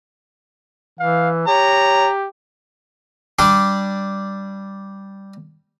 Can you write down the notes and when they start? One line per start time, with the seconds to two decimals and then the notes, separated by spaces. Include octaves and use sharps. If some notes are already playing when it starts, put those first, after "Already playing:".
0.99 E3 F5
1.47 G4 C#5 A#5
3.39 G3 D4 C6 D6